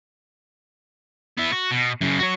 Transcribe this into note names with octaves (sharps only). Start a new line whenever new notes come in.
B3 E4
F#4
B2
F#2 C#3
F#4 C#5